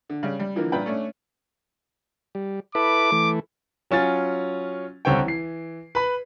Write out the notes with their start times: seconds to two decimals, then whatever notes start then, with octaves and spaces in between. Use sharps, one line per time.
0.10 D3
0.23 C#3 G3
0.40 G3
0.56 D3 E3 F3 A#3
0.72 G2 A#2 B4 G5
0.86 A3 C#4 D4
2.35 G3
2.75 E4 A4 B4 D6
3.12 E3 A3
3.91 F#3 C#4 F4 A6
5.05 C2 D3 C4 C#5 G5
5.25 E3 C7
5.95 B4 B5